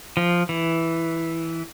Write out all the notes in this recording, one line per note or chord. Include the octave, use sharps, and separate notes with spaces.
F3
E3